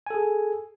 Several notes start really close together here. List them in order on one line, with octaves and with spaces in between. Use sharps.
G#5 A4 G#4